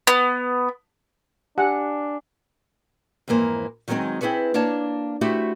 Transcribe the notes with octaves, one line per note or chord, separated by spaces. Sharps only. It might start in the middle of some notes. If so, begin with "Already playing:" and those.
B3
D4 G4 F#5 G#5
F2 G#2 E3 A#3 C5
D#3 F#3 G#3 A#3 C4 D#4
C4 E4 G#4 B4 C#5
A#3 D4 C#5 A5
A3 E4 F#4 G4 C5